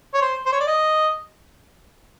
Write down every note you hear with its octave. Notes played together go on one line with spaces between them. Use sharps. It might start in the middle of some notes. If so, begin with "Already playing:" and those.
C#5
C5
C5
C#5
D5
D#5